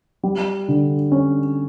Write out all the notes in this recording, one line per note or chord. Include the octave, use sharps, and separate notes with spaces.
G3
D3
C#4